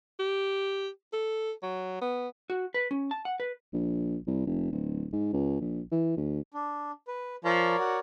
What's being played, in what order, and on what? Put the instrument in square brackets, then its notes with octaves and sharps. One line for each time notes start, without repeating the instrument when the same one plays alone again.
[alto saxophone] G4
A4
F#3
B3
[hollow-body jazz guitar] F#4
B4
C#4
A5
F#5
B4
[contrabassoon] A#1
C2
F1
D1
G#2
C#2
A#1
E3
D2
[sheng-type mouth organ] D4
B4
[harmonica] F3 [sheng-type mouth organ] A#4 C#5 D5
[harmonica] F#4